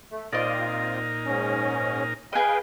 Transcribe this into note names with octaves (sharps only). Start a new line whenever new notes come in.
A3
A#2 C4 D#4 F4 A#4 D5 D#5
G#2 C#4
G#4 B4 D#5 F5 G5